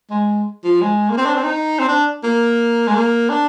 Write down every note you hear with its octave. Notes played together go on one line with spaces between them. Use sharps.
G#3
F3
G#3
A#3
C4
D4
C4
D#4
C4
D4
A#3
G#3
A#3
D4